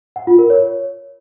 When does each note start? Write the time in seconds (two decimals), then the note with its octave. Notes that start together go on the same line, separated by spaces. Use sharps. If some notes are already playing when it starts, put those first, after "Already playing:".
0.16 F#5
0.27 F4
0.39 A#4
0.50 C#5